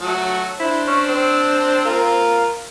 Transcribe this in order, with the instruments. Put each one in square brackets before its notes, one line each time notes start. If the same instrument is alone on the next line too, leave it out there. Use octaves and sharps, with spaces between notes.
[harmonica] F#3 A3 F#4
[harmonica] D4 C5 [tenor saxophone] E4
[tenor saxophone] C#4
C4
[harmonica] F4 A#4